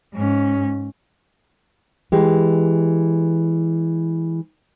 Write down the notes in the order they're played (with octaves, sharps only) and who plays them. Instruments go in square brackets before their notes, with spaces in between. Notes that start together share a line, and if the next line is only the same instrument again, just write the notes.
[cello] G#2 C#4
[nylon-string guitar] E3 G#3 G4